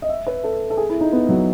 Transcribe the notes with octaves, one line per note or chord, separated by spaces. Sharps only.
D#5
E5
B4
A4
A4
G#4
E4
D#4
B3
F#3